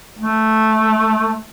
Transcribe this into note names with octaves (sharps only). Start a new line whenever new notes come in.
A3